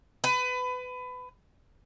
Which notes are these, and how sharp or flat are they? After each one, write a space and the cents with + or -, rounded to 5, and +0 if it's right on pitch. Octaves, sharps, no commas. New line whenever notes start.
B4 +25